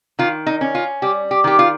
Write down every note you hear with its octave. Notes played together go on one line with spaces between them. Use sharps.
D#3 F4
D#4
C#4
F4
G3 G4
G4
D#3 G4
F4